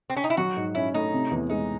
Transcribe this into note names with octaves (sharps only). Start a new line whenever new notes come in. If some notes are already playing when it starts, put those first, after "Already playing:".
C4
C#4
D#4
E4
F#3 F#4
G#2
C#4 E4
A3 D#4
C3
E2
G#3 D#4